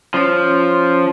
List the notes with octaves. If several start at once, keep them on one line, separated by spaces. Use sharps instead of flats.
F3 C#4 C#5